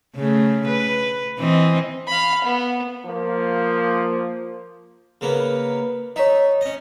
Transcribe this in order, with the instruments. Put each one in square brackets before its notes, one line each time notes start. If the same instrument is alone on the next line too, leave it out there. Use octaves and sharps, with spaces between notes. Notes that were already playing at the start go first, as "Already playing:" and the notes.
[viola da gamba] C#3 A3
B4
E3 C4 D#5
[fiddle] F5 B5
B3
[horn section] F3 A#3
[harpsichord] C#3 A#3 B3
[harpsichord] D#4 E5 [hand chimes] C#5 D#5
[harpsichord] C#4 D#5